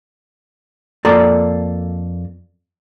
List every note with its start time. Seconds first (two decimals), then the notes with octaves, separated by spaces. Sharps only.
1.05 F2 A#3 A4 D5 A#5